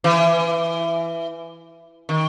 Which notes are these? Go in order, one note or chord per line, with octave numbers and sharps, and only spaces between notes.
E3
D#3